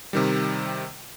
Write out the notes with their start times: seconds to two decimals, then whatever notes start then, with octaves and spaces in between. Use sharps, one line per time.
0.13 C3 D#3 G3